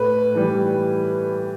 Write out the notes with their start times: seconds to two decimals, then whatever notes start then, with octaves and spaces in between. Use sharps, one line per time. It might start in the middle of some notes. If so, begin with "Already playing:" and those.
Already playing: A2 B4
0.35 E3 G3